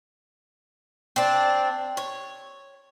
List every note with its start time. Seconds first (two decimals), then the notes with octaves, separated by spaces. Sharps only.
1.16 C4 D4
1.97 C#5